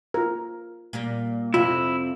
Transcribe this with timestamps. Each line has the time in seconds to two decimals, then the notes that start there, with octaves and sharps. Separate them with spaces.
0.14 F4 A#4
0.93 A#2 G3
1.54 F2 C3 E4 F4